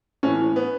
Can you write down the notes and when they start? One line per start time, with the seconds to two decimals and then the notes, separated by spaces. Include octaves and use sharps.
0.23 A2 E3 C#4
0.56 B3